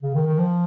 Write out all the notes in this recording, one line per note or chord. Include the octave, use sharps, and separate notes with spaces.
C#3
D#3
D#3
F3